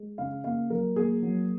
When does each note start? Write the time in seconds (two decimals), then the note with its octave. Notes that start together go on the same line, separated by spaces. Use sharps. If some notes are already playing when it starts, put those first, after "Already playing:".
Already playing: G#3
0.18 C#3 F5
0.44 A#3 F5
0.70 F#3 A#4
0.96 A#3 G#4
1.23 F#3